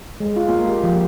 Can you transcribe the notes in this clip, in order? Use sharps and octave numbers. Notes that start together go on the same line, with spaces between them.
G#3
F4
A#3
G4
F3